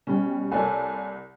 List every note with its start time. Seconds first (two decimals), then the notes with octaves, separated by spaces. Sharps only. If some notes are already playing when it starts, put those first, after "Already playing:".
0.07 B2 G3 C#4
0.51 C2 A#3 A4 C#5 D5 G#5